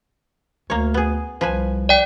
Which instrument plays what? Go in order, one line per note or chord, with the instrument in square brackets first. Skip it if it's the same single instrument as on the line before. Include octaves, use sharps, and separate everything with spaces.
[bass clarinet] D2 [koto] A#3 C#5
[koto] B3 G#4
[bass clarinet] C2 [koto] F3 B4 G#5
[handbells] D5 G5